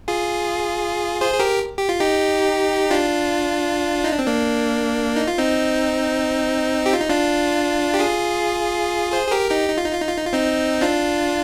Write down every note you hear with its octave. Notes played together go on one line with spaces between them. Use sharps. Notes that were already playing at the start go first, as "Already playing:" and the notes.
F4 G#4
G#4 C5
G#4
G4 A#4
G4
F4
D#4 G4
D4 F4
D#4
D4
C4
A#3 D4
D#4
F4
C4 D#4
G4
F4
D#4
D4 F4
G4
F4 G#4
G#4 C5
G#4
G4 A#4
D#4 G4
D#4
F4
D#4
F4
D#4
F4
D#4
F4
C4 D#4
D4 F4